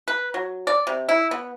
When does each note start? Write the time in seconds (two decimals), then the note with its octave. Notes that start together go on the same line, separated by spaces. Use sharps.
0.08 B4
0.34 F#3
0.67 D5
0.87 C3
1.09 E4
1.31 B3